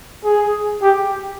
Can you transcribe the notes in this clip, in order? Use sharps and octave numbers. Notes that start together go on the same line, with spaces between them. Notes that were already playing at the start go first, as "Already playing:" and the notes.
G#4
G4